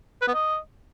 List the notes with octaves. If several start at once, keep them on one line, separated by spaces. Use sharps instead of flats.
B4
B3
D#5